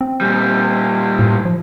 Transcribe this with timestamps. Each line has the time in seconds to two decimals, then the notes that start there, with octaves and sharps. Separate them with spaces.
0.01 C4
0.21 A#2 G3
1.19 A2
1.45 F3